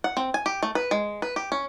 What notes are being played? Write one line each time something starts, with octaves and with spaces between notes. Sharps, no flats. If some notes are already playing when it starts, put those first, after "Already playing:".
F#5
C4
G#5
G4
A3
B4
G#3
B4
G4
C#4